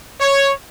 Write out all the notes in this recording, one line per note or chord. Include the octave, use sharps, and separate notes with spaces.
C#5